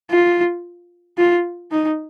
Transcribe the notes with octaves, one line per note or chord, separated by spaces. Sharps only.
F4
F4
D#4